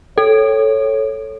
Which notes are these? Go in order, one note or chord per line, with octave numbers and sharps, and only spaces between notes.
A4 C#5